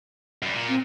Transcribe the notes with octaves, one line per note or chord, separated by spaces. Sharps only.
F#2 G3
A#2
C4